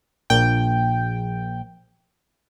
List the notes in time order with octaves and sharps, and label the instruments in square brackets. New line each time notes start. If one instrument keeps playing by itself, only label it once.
[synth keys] A#1 G5